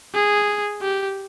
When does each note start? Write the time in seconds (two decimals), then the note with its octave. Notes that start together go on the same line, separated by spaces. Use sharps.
0.14 G#4
0.81 G4